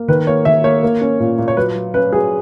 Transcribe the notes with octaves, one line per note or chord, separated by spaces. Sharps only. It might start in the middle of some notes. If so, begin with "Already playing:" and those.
Already playing: A#3
D#3 B4
A#3 C#5
D#3 E5
A#3 C#5
A#3
C#4
A#2
A#2
C#5
F#3 B4
F#3
C#4 B4
F#3 G#4